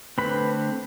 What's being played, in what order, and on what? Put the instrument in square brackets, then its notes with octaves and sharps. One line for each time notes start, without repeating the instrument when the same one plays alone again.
[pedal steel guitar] D3 A3 C4 B4 B5